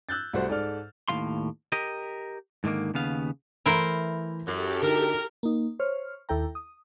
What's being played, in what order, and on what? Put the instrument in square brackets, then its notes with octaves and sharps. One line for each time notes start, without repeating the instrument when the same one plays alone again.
[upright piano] E6 F#6 G6 A6
C2 G3 A3 F#4 C5
G#2 A4 D5 F6
[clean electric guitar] D#2 A2 G#3 F5 C6
G4 A#4 D#5
G#2 D3 D#3 A#3
D#2 C#3 B3 F5
[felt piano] E3 A3 [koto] E4 A#4 C5
[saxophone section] F#2 [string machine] G4 A4
[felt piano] D3 D#4 F#4 [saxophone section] A#4
[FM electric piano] A#3 D#4
C5 C#5 F6
D#2 E4 A4 G5 A#5
D#6